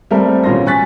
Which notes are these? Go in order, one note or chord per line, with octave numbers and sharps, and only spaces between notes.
G3 A3 C4 A4 A#4 E5
A1 B2 C#4 F4 C6 A#6
G#5 C#6 F#6 A6 B6